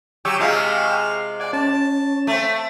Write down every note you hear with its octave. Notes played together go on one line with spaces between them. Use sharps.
F#3 G4 G5 C#6 E6
C3 G#3 F4 F5
D5 F#5 G#5
C#4 A5
A3 C4